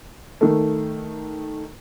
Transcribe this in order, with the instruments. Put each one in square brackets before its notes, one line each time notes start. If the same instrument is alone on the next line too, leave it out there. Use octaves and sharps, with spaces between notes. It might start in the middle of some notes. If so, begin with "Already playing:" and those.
[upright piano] D#3 A3